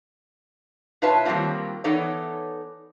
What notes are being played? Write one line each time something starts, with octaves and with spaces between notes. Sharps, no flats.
B2 F4 B4 C#5 E5 A5
D#3 F#3 G3 A#3 C4 F4
E3 B3 D#4 A4 C#5 D5